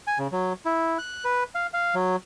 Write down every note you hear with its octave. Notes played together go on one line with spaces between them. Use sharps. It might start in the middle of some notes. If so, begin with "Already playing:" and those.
G#5
C#3
F#3
E4
F#6
B4
F5
F5
F#3